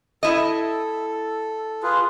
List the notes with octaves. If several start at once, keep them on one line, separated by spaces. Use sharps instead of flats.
E4 A4 D#5
F4 G#4 B4